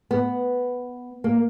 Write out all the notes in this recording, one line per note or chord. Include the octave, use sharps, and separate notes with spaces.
B3
A#3